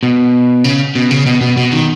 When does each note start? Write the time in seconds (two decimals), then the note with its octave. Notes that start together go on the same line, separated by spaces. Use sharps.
0.03 B2
0.64 C#3
0.95 B2
1.11 C#3
1.26 B2
1.41 B2
1.57 B2
1.72 D#3